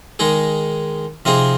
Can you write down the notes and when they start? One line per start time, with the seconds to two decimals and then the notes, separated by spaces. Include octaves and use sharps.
0.19 D#3 G#3 D#4 G#4
1.25 C3 F3 C4 D#4 G#4